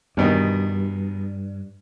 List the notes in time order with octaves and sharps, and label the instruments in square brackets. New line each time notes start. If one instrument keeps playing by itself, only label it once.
[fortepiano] E2 B2 D#3 [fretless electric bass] G2